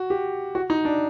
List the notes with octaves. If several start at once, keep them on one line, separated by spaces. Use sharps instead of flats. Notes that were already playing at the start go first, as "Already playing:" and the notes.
Already playing: F#4
G4
F#4
D#4
D4